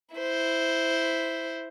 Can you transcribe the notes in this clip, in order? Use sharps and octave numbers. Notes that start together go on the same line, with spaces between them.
E4 C5